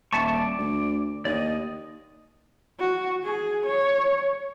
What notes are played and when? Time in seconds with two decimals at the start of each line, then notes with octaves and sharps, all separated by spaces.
0.13 D#1 E5 A5 C#6
0.34 D5
0.58 D2
1.25 D#2 D5 D#5
2.79 F#4
3.24 G#4
3.66 C#5